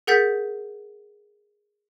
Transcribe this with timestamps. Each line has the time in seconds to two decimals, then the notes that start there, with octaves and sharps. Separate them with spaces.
0.07 G#4 A#4 F#5 G6 A6 B6